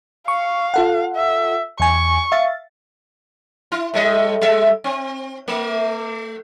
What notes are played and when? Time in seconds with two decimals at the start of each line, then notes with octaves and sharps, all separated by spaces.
0.28 F5 C#6
0.74 F4 A4 F#5
1.16 E5
1.80 E2 G#5 C#6
2.32 E5 F5 A6
3.72 E4
3.94 A2 G3 D#5
4.41 G3 E5
4.84 C4
5.48 A3